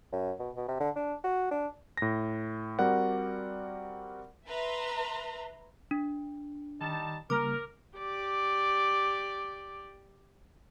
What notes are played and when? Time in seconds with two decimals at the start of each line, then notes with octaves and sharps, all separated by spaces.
0.13 F#2
0.40 B2
0.56 B2
0.68 C3
0.80 D3
0.96 D4
1.24 F#4
1.51 D4
1.97 A2 A#6
2.79 G3 C4 F#4 A#4 D5 F#5
4.48 B4 E5 A#5 C6
5.91 D4
6.81 D#3 G3 D#4 A5
7.30 C#3 G3 A#3 A#4 D6
7.98 G4 D5